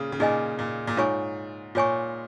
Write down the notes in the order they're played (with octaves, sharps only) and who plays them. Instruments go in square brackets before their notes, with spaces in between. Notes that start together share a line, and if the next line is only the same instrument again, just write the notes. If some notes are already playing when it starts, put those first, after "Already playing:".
Already playing: [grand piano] A#2 C#3
C#3
[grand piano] A#2 [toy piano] D#4 G#4 D#5 G#5
[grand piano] A#2
A#2
[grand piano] G#2 [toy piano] F4 C#5 G#5 C#6
[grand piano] A#2 [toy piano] F4 C#5 G#5 C#6